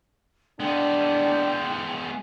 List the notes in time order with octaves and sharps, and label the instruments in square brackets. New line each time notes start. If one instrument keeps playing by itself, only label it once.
[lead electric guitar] G#3 B3 [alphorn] D4 [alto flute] G5